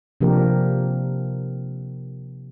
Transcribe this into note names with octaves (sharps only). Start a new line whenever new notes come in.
C3 F3 A#3 D4 G4 A#4